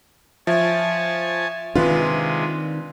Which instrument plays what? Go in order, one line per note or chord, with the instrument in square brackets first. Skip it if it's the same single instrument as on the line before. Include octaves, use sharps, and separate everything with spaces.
[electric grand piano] F3 [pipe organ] C#5 G#5 A5 [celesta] E5
[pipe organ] C3 G#3 [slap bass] D#3 C4 D4 [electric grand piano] F4 B4